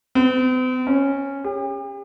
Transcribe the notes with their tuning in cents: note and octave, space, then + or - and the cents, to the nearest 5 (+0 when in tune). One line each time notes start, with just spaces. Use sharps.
C4 -45
C#4 -5
G4 +40